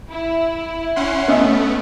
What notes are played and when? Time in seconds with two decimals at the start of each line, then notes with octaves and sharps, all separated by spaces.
0.10 E4
0.96 C#4 F#5 C6
1.28 A3 B3 C#4 D#5 E5